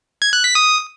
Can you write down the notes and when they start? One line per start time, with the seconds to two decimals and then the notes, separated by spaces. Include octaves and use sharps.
0.22 G#6
0.33 F#6
0.44 B6
0.55 D#6